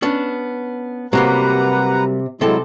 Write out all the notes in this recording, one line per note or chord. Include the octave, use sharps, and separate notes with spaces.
B3 C#4 D4
C3 F#3 G3 A#3 B4 F#5 A#5
C3 F#3 G#3 C4 E4 A4